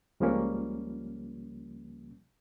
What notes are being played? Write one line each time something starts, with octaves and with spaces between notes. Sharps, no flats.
C#2 C#3 F3 G3 A#3 C#4